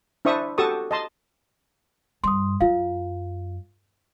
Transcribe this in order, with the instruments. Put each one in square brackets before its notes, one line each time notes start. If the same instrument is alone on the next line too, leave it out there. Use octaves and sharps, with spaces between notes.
[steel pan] D4 E4 C5 E5 C#6 D#6
F#4 G4 A4 A5 C#6 D#6
D#5 A5 C6
[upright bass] G2 [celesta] C6 D#6
[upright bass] F#2 [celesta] F4 F5